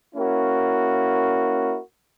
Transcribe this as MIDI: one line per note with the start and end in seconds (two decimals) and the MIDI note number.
0.15 1.78 58
0.15 1.78 61
0.15 1.78 64
0.15 1.78 66
0.15 1.78 70